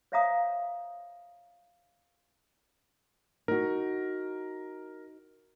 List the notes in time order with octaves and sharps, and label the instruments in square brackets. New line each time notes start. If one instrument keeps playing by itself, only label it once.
[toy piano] C5 C#5 E5 F5 A#5 D#6
[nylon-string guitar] D#4 F#4 [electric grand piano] A#4